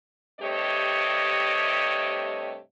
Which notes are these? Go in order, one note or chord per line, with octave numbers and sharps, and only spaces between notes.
G2 C3 A3 G4 C#5 D#5